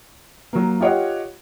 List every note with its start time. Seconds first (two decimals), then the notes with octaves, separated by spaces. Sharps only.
0.53 F#3 A#3
0.80 F4 G4 C#5 D#5 F#5